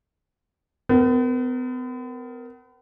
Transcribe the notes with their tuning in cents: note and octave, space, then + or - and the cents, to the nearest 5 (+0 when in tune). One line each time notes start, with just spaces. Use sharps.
B3 +40 A#4 +0